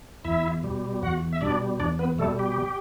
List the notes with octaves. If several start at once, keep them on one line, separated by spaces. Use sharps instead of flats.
E2 E4 E5
B2 G3
E2 F#4 F#5
E5
B2 G3 D4 D5
E2 D4 D5
B3 B4
B2 G3 A3 A4
G4